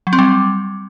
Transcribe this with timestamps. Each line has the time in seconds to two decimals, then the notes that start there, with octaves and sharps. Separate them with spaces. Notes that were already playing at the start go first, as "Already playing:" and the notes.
0.07 F#3
0.13 C4
0.19 G3